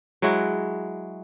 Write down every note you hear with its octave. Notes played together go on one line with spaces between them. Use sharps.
F#3 G#3 E4 F#4